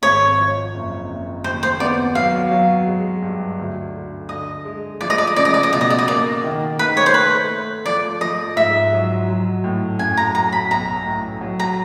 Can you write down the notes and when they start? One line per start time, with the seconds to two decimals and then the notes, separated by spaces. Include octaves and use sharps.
0.02 G#1 C#5
0.37 F3
0.74 F#1
1.09 F#1
1.44 D#2 C5
1.63 C5
1.80 B3 D5
2.15 F#3 F5
2.51 F#3
2.87 G#3
3.22 G2
3.59 D2
3.94 D3
4.29 D3 D#5
4.65 G#3
5.01 F3 D5
5.10 D#5
5.18 D5
5.27 D#5
5.36 C#3 D5
5.45 D#5
5.54 D5
5.63 D#5
5.72 B2 D5
5.81 D#5
5.90 D5
5.99 D#5
6.08 A#3 D5
6.43 D#3
6.78 D#3 B4
6.97 C#5
7.06 C5
7.14 A3 B4
7.50 A3
7.85 F3 D5
8.21 F3 D#5
8.56 G#2 E5
8.93 F#3
9.28 F#3
9.64 A2
9.99 F#2 G#5
10.17 A#5
10.35 F#3 A#5
10.52 B5
10.70 B1 A#5
11.06 A2
11.41 F#3
11.60 A#5